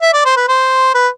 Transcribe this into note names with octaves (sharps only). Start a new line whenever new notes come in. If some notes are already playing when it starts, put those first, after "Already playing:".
E5
D5
C5
B4
C5
B4